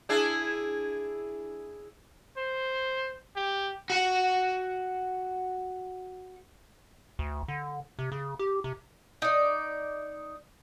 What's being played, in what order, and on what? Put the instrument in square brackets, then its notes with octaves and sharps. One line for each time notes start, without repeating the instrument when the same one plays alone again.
[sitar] D4 E4 G#4
[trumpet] C5
G4
[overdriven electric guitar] F#4 F#5
[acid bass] D2
D3
C3
C#3
G4
C3
[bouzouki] D#4 D5